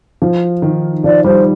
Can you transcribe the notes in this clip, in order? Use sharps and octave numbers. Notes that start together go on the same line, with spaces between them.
F3
D#3
F3 D5
G3 C5